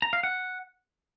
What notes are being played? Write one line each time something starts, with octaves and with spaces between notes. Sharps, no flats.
A#5
F5
F#5